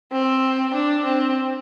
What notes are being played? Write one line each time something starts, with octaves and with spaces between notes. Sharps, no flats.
C4
D4
C4